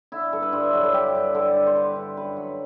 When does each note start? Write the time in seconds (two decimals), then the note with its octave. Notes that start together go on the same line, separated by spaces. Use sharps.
0.12 D3 E4
0.33 G2 A4
0.42 B4
0.52 G2 C5
0.63 E5
0.73 F#3 B4
0.84 A4
0.93 D3 G4
1.15 G2
1.34 D3 A4
1.55 G2
1.67 C5
1.76 D3 B4
1.96 D3
2.17 F#2 B4
2.37 F#3